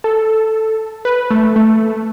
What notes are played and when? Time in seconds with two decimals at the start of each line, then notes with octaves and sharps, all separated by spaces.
0.04 A4
1.05 B4
1.31 A3
1.56 A3